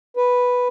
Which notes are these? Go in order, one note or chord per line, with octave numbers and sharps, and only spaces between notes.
B4